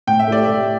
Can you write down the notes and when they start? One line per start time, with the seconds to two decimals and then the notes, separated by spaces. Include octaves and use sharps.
0.07 A2 G5
0.19 E5
0.28 A3 E4 G4 D5
0.45 A2 E5